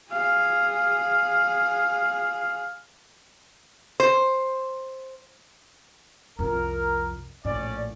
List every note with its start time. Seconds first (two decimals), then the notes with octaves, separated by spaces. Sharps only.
0.11 G#4 F5
4.00 C5
6.39 C2 F2 A#4
7.45 A#1 A2 C#4 D5